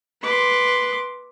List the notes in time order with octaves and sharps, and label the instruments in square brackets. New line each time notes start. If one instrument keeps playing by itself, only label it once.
[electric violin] B4 [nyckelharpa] C6 D6